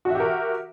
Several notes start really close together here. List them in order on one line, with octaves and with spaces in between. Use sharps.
F#4 E5 G4 A#4